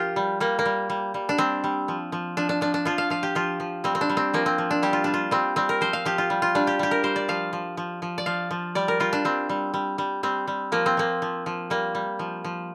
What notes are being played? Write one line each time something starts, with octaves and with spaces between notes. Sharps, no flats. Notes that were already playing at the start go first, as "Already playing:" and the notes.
Already playing: F3 F4 G4 A#4
G3
G3 A#3
A#3
G3
G3
G3
D4
G3 C4
G3
F3
F3
F3 D4
D4
F3 D4
D4
F3 F4
F5
F3 F5
G4
F3 F4
F3
G3 C4
C4
D4
G3
C4
F3 A#3
C4
F3
D4
G3 G4
F4
G3 D4
F4
G3 C4
G3 C4
A#4
F3 C5
F5
F3 G4
F4
G3
F4
G3 D4
G4
G3 G4
A#4
G3 C5
D5
F3 F5
F3
F3
F3
D5
F3 F5
F3
G3 D5
A#4
G3 F4
D4
G3 C4
G3
G3
G3
G3 C4
G3
F3 A#3
C4
F3 A#3
F3
F3
G3 A#3
G3
F3
F3